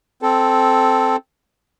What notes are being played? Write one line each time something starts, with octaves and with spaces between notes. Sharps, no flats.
C4 A4